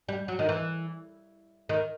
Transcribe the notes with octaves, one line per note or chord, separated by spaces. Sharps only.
G3
F#3
D#3
E3
D#3